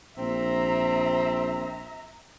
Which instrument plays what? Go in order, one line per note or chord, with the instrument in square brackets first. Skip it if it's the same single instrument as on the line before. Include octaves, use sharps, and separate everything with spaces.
[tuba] A#1 [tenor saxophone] C4 [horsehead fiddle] E5 A#5